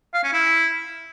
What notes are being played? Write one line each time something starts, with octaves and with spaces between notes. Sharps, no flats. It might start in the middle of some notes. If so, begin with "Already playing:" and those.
F5
C#4
E4